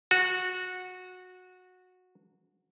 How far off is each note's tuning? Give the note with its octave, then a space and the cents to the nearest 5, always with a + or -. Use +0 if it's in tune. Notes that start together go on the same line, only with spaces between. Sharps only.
F#4 -15